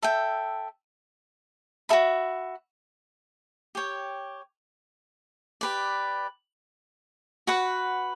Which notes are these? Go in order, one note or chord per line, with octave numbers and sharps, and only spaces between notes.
A4 E5 G5
F#4 A4 E5 B5
G4 C#5 G5
G4 B4 D5
F#4 B4 F#5